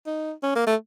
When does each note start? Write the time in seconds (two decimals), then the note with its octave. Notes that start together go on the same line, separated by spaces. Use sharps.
0.06 D#4
0.43 C#4
0.55 A#3
0.67 A3